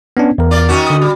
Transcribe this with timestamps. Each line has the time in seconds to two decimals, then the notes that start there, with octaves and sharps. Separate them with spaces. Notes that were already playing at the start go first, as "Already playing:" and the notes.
0.17 B3 C#4 D4
0.38 E2 A#4
0.51 F4 D5
0.69 D#3 C#4 F#4
0.87 D3 D#6
1.01 G3